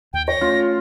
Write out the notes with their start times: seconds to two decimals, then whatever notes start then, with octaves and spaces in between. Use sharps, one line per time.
0.13 D#2 G5
0.28 C#5 A#6
0.41 A3 C#4 F4